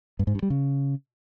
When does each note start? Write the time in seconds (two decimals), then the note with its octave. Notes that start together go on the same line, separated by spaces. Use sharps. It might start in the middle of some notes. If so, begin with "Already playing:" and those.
0.19 G2
0.27 G#2
0.35 G2
0.42 G3
0.50 C#3